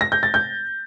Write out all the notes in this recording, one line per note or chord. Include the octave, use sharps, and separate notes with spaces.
A#6
G6
A6
G6